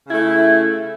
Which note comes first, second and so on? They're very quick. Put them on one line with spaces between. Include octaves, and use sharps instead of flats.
C#3 E4 A3